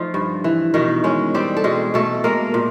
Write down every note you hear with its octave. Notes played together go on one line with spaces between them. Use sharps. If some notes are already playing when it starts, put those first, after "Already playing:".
Already playing: F3 A3 D#4 F4
G2
E3
B2 D#3 D#4
G#3 C#4
G3 C4 G4
A4
B2 G#3 G#4
B2 A3 A4
G#3 A#3 A#4
A#2